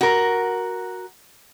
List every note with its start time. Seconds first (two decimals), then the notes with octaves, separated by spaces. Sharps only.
0.01 F#4 A#4